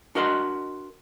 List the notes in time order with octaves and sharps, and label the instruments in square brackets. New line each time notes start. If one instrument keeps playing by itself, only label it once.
[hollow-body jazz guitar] D4 F#4 A#4 D#5 F#5 C6